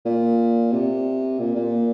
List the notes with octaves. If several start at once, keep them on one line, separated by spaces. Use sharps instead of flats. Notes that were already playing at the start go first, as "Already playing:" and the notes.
A#2
C3
A#2
A#2